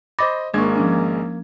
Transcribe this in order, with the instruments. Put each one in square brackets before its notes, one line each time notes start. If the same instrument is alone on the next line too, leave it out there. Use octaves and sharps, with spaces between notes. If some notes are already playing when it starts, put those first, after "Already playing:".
[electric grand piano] C5 D#5 B5 [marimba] D6 A6 A#6
[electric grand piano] G#1 G#3 G#6 [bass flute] A#3 [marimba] D4 C#6
[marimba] F3 C#4 D4